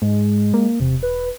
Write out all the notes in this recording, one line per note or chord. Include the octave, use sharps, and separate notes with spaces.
G#2 G#3
A#3
E1 C3
B4